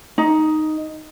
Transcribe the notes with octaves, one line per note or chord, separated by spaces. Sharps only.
D#4